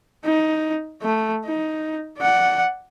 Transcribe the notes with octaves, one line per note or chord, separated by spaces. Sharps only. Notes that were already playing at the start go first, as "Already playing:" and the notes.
D#4
A3
D#4
D5 F#5